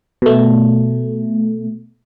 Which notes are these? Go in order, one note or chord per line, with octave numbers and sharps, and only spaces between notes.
B2 A3